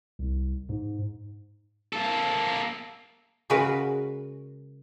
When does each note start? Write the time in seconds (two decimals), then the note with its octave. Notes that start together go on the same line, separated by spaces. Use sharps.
0.19 C2
0.69 G#2
1.93 A#3 A4
3.50 C#3 G#3 F#4 A#4 B4